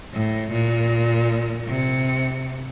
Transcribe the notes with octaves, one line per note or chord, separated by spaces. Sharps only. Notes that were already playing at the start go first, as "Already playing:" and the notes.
A2
A#2
C3